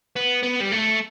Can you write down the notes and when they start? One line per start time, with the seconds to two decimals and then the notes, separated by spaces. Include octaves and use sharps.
0.16 B3
0.43 B3
0.61 G3
0.72 A3